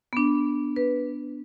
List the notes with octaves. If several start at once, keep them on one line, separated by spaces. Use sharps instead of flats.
B3 D4
B4